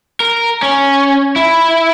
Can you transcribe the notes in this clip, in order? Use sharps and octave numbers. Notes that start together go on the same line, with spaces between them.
A#4
C#4
E4